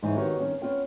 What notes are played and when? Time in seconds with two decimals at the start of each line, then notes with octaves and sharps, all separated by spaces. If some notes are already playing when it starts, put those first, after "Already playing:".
0.02 G#2 E3 D#4 C#5 G#5
0.16 D#3 B3 D#4 F#4 G4 C#5
0.40 G2 D#3 C#4
0.62 B3 C#4 F4 D5 G5